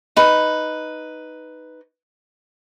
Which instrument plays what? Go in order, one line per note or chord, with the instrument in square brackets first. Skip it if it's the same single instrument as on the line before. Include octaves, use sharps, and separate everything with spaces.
[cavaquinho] D#4 B4